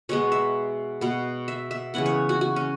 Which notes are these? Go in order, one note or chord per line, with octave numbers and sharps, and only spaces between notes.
B2 G#3 B3 C#5
E5
B2 B3
E5
E5
C#3 E3 B3 F#5
C#5
F#4
F#4
C#4